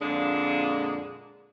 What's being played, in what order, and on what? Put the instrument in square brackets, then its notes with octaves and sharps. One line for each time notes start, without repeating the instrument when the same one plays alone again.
[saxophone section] F2 A#2 D3 G#3 A#3 D4